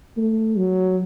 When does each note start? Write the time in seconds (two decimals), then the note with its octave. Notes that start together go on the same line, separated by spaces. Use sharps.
0.17 A3
0.57 F#3